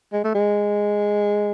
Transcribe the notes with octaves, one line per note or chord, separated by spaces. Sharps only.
G#3
A3
G#3